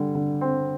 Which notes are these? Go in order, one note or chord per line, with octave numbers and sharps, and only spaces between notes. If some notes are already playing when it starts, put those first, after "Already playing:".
Already playing: D3 G3
D3
C4